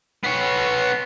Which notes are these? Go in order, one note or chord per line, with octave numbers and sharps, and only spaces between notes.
B3 C#5